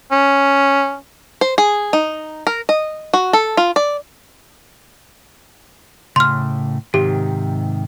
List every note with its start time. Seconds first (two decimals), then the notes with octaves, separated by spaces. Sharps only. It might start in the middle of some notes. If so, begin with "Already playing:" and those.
0.12 C#4
1.41 C5
1.58 G#4
1.93 D#4
2.47 A#4
2.69 D#5
3.14 F#4
3.33 A4
3.57 F4
3.76 D5
6.16 A2 C#3 C6 F6
6.94 G#2 C3 D#3 G4